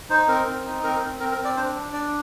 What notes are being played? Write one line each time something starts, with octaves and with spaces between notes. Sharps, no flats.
D#4 C5
C4 A#4
C4
D#4
C4 A#4
C4
C4 A#4
A#4
C4
D5
D4 C5
D4
D4 D5